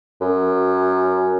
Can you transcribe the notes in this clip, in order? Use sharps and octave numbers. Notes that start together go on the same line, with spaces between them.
F#2